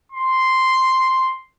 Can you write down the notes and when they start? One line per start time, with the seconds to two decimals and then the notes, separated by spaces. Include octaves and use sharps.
0.12 C6